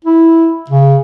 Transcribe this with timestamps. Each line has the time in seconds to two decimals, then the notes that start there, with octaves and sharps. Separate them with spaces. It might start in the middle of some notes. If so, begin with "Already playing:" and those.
0.05 E4
0.70 C#3